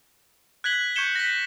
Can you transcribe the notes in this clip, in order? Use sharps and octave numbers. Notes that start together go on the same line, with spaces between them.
F#6 G#6 B6 F#7 G7
C#6 G6 G#6 C#7 E7 G7
A#6 B6